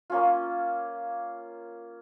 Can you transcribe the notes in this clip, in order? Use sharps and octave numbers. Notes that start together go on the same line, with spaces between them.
A#3 C#4 F4